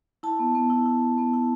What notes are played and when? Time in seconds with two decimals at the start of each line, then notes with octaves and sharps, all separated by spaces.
0.23 E4 A5
0.39 B3
0.55 B3
0.70 E4
0.86 E4
1.01 B3
1.18 B3
1.33 E4